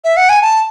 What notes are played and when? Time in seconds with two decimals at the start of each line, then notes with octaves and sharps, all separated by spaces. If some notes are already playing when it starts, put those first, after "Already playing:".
0.04 E5
0.17 F#5
0.29 G#5
0.42 A5